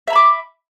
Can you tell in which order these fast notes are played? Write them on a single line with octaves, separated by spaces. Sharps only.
E5 A#5 B5 D6